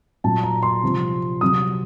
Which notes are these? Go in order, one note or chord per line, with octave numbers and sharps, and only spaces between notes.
A#2 F#3 A5
A#5
C6
C3 F3
C3 F#3 D#6